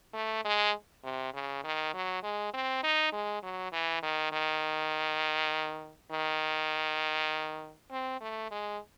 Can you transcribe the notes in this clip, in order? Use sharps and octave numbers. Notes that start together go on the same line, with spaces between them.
A3
G#3
C3
C#3
D#3
F#3
G#3
C4
D#4
G#3
F#3
E3
D#3
D#3
D#3
C4
A3
G#3